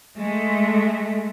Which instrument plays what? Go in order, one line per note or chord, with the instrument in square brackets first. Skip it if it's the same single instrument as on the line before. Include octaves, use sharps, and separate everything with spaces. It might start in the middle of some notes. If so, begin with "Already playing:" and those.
[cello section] G#3 A3